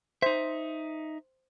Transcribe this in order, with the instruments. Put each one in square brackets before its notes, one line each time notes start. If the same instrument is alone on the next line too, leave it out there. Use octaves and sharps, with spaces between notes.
[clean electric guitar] D#4 E5 [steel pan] C5